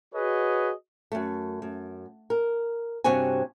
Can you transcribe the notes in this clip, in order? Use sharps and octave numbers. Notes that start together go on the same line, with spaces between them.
F#4 G#4 B4 C#5 D#5
F#2 A3
F#2
A#4
G2 C3 C4 F#4 C#5 G#5